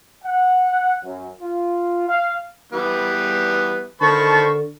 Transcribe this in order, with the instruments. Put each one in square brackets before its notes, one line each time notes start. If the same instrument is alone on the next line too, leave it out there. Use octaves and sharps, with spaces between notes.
[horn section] F#5
F#2
F4
F5
[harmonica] E3 G3 B3
[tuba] D3 [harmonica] D#3 C5 B5 [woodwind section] A#4 A5 C#6